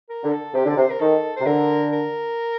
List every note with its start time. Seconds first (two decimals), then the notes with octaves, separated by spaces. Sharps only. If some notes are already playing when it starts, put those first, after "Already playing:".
0.09 A#4
0.24 D3
0.32 A4
0.54 C3 G4
0.66 D3 D5
0.77 C3 C5
0.90 A#4
1.00 D#3 A4
1.36 C3 C5
1.46 D3 A#4
1.93 A#4